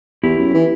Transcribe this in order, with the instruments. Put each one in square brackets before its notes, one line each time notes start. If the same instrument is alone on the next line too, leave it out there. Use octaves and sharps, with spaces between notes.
[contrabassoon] E2 [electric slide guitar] E4 G4
[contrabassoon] F#2
E3